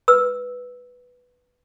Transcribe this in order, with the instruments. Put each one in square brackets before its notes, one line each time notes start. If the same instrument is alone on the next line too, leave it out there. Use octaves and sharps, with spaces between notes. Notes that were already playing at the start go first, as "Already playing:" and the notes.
[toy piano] B4 E6